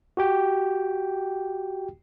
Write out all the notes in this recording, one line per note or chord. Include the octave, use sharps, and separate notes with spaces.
F#4 G4 G5